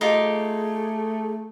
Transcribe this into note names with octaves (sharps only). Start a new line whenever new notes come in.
A3 D#4 F4 G4 G#4